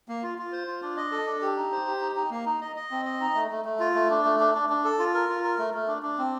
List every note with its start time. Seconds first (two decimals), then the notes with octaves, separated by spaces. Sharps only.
0.09 A#3
0.23 F4
0.38 F4
0.52 C5
0.67 F4
0.82 D4
0.97 D#5
1.12 A4
1.27 D4
1.41 G4
1.56 D#4
1.72 C5
1.87 G4
2.01 D#4
2.16 D#4
2.31 A#3
2.46 D#4
2.61 D#5
2.76 D#5
2.91 C4
3.05 D#5
3.20 D#4
3.35 A3
3.51 A3
3.65 A3
3.79 F4
3.95 A3
4.10 D4
4.25 A3
4.40 D4
4.55 D4
4.70 D4
4.84 A4
4.99 F4
5.14 A#4
5.29 F4
5.44 A#4
5.58 A3
5.74 A3
5.88 D4
6.03 D4
6.18 C4